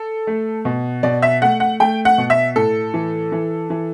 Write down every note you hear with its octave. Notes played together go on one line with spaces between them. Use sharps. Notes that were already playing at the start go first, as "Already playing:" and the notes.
Already playing: A4
A3
B2
B2 D5
E5
A3 F#5
F#5
A3 G5
F#5
B2
E5
A2 A4
E3
E3
E3